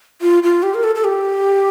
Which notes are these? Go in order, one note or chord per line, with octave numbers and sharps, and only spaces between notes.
F4
F4
G4
A#4
A4
A4
G4